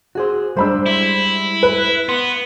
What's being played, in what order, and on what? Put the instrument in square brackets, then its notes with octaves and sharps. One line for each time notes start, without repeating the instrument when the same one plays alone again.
[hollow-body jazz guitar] F#4 G#4 C5
[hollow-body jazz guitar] G3 G#3 D4 [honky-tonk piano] C5 B5 E6
[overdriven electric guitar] E4
[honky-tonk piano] B4
[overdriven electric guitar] B3 [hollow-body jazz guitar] C6